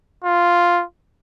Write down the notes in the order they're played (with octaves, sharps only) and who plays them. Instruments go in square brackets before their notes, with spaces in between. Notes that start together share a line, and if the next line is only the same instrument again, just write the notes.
[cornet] F4